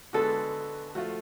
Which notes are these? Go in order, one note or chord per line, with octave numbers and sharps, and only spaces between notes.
D3 G#3 B3 F#4 A4
F3 A3 F4 F#4